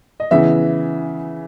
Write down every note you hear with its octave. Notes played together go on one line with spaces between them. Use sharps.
D#5
C#3 E3 B3 E5